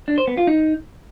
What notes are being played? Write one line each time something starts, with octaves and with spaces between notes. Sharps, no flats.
D4
C5
B3
F4
D#4